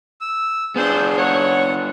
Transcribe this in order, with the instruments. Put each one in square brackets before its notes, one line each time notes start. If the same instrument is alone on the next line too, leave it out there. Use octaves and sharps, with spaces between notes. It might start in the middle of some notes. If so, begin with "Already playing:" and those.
[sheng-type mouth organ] E6
[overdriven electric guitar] B3 D4 [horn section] C4 F4 C5 [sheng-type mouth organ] G#4
[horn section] C#5 [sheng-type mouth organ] F#5